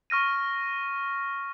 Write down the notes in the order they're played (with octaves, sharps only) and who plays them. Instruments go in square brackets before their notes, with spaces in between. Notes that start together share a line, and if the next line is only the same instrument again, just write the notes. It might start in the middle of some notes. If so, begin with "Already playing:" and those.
[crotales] C#6 F6 A#6 D#7